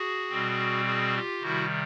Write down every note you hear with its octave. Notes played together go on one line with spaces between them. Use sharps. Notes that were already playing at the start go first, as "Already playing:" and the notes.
Already playing: F#4 G#4
B2 G3 C4
F#4 G#4
F4 G4
C3 D#3 G3 E4 F#4